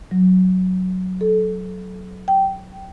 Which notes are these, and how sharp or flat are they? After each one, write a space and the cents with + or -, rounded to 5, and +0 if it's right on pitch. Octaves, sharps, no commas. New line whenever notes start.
F#3 +0
A4 -20
G5 -15